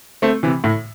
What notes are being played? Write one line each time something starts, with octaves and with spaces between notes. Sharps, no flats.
A3 C4
C3 E3
A2